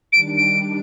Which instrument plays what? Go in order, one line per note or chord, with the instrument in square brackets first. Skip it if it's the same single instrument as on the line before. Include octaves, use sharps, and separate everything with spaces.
[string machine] D#3 G3 D4 [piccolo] D7
[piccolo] D7